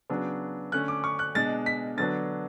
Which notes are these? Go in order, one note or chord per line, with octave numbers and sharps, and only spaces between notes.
C#3 F#3 B3 D4
D3 A3 C#4 F#6
D6
C#6
F#6
B2 G#3 D4 A6
B6
D3 F#3 B3 D4 A6